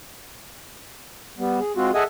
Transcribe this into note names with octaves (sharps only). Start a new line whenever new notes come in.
G3 B3
G#4
G#3 C4 F4 F#4
G#4 A4 D#5 E5 F#5 G#5